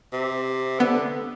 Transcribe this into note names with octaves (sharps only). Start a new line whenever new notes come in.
C3
D3 B3